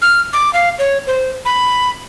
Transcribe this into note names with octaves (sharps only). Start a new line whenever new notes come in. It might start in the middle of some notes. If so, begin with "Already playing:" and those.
F6
D6
F5
C#5
C5
B5